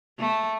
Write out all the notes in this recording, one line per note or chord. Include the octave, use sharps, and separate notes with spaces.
A3